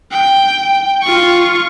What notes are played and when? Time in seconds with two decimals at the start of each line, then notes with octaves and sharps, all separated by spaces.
0.11 G5
1.02 F4 C#6